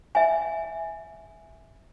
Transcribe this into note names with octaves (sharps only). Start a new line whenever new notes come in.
E5 G#5